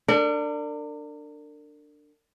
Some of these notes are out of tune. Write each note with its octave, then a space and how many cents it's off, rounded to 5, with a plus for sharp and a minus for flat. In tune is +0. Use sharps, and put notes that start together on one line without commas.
D4 +10 A#4 -40